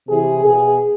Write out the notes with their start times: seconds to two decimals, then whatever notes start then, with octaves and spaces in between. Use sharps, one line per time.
0.09 C3 E3 G#4
0.44 B2 G#4